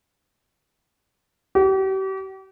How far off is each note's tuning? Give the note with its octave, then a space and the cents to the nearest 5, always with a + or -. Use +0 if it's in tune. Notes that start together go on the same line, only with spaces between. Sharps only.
G4 -40